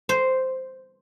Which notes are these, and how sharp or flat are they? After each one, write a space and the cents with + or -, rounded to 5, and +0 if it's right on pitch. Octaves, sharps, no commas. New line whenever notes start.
C5 -5